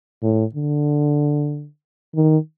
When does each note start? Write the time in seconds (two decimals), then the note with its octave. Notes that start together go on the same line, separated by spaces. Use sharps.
0.22 A2
0.54 D3
2.15 D#3